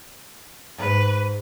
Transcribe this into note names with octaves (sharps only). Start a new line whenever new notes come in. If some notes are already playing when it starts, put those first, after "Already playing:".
F2 G#2 B4